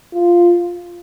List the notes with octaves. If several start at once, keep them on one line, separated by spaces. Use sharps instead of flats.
F4